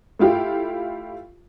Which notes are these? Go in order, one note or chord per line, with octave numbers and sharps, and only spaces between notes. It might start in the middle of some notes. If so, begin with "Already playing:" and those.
A3 E4 F4 G4